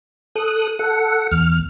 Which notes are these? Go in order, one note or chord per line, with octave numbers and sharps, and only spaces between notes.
A4 D#6 F#6
A4 F#5
E2 F6